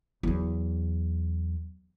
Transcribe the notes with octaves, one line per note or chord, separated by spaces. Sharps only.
E2 F#3